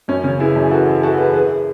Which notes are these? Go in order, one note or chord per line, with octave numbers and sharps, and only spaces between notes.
F#2 C#4
C#3 C#4
E3 E4 G#4
F#2
E3 F#4 A4
E3
E3 F#4 A4
E3 G#4 B4
E3 G#4 B4